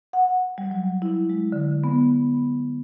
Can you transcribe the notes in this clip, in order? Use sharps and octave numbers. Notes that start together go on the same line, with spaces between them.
F#5
G3
F#3
E4
G#3
D3
B3